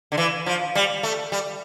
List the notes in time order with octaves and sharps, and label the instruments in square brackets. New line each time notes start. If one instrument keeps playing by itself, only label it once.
[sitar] D3
E3
F3
G3
A3
G3